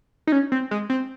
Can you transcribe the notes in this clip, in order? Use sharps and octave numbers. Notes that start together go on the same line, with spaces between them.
D#4
C#4
C4
G#3
C4